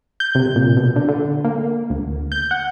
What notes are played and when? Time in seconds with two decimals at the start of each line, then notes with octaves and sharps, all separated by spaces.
0.20 G6
0.35 C3
0.56 A#2
0.77 B2
0.96 D3
1.08 D3
1.45 A#3
1.90 D2
2.32 G6
2.51 F#5